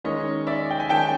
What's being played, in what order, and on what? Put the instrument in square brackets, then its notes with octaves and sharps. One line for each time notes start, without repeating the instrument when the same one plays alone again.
[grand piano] D#3 G#3 C#4 C#5 D#5
D5 E5
G5
G#5
D#3 G#3 C#4 G5 A5